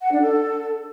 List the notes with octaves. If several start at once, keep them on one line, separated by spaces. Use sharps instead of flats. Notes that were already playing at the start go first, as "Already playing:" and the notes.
F#5
D4
A4